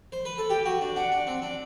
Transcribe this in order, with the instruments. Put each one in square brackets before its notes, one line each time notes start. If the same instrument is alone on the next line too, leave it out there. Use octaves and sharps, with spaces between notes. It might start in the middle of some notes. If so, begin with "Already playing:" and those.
[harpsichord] C5
B4
A4
[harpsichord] G4 [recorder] G5
[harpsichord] F#4
D4
[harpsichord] D4 [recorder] F#5
[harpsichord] D4
C4
D4